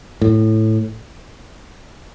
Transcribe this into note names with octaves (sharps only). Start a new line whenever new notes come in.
A2